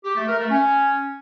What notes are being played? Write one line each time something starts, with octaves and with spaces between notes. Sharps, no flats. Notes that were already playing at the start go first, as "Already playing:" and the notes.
G4
A3
A#4
A3
C#4